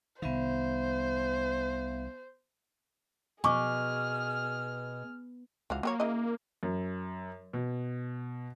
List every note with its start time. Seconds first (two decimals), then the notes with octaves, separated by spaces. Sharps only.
0.22 C2 D#3 B3 C5 E5 F5
3.44 B2 G#4 G#5 C#6 D6 F6
5.70 C#2 E3 F#4 F5
5.83 F#3 A#3 G4 C#5
6.00 C#3 E4 D#5
6.63 F#2
7.53 B2